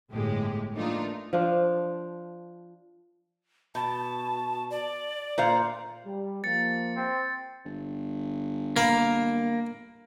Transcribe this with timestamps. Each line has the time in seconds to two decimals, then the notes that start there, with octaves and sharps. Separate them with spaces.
0.12 G1 A2 G#3 G4
0.74 E3 A3 A#3 D4 D#4 F4
1.33 F3 D4 F4
3.75 B2 A5
4.70 D5
5.38 A#2 C5 F5
6.06 G3
6.44 F3 A#3 A6 C#7
6.96 C4
7.65 G1
8.76 A#3 A#4 F5 B5